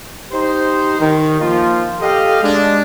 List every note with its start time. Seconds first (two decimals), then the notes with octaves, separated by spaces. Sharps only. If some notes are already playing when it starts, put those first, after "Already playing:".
0.31 D#4 G4 C5
1.00 D#3
1.41 F3 A#3 F4
2.01 G4 A4 D#5 F5
2.42 G#3 D4